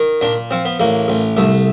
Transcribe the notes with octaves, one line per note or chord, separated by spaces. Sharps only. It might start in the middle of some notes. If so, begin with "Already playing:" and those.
Already playing: D#3
A#2 D4
F3 C4
B3
A1 A#3
A1
C2 A3